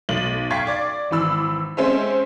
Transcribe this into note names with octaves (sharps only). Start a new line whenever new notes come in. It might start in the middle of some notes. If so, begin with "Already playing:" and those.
B1 A6 F#7
F5 G5 C#6 G#6 B6
D5 D6
G#1 E3 B5 E6
G#3 C4 C#4 C5 E5